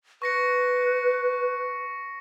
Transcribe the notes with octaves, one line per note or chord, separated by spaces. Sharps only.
B4 C#6 A#6 C#7